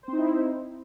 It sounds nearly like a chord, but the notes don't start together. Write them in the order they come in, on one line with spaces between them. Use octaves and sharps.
C5 C4 D#4 E4